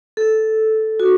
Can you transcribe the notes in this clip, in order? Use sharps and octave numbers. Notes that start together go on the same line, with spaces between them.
A4
F#4